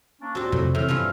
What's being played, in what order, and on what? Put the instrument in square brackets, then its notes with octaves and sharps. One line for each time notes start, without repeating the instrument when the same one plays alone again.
[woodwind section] A#3 C#4 D4
[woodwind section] D#2 A#2 F#4 [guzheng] C4 D4
[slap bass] F2 C3 A3 [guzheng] A2
[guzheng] A2 [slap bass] C3 E3 [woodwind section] E5 F6
[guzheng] G2 E3 F3 [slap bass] B3